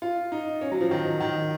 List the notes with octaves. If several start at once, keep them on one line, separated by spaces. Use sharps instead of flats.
F4
D#4
C#4
F#3
F3
D#3
D#3